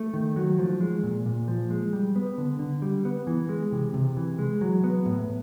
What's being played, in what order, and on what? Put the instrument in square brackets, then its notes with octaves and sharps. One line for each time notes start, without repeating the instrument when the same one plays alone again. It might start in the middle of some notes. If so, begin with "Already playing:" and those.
Already playing: [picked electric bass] A3
D#3
F#3
F3
G#3
A#2
A#2
F3
G#3
G3
B3
D3
D3
G3
B3
E3
G#3
C3
C3
E3
G#3
F#3
B3
A2